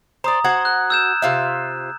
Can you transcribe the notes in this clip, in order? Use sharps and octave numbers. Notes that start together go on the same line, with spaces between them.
C5 D5 A#5 D#6
F#4 C5 F#5 G#6
F#6
E6 G6 E7
C3 F4 E5